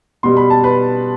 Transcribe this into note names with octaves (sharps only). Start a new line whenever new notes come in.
B2 G3 C6
B5
A5
B4 B5